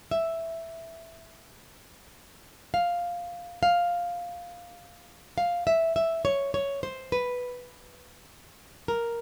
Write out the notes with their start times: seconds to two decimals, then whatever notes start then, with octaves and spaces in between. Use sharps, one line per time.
0.11 E5
2.74 F5
3.63 F5
5.38 F5
5.67 E5
5.96 E5
6.25 C#5
6.54 C#5
6.83 C5
7.12 B4
8.88 A#4